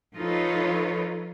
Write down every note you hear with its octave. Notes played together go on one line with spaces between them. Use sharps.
F3 D#4 F4 A4 B4 C#5